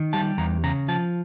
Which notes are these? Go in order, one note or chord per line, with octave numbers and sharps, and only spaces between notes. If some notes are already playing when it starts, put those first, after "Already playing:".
Already playing: D#3
G3 A5
E2 A#5
C#3 A#5
F3 A5